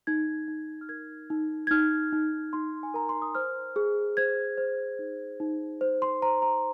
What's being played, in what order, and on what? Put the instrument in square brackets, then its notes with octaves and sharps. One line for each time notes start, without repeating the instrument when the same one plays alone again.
[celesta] D#4 G#6
D#4
F6
A#4 G#6
D#4
G#6
D#4 F6
D#4
D#4 C6
G#5
A#4 A#5
C6
D#6
C5 F6
G#4
C5 G#6
C5
D#4
D#4
C5
C6
C5 A#5
A#5